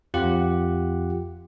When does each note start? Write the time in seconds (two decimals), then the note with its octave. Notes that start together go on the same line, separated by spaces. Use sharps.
0.14 F2 F4 G4 F#5